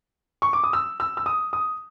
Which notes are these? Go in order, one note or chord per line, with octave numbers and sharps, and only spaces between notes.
C#6
D6
D#6
E6
E6
E6
D#6
D#6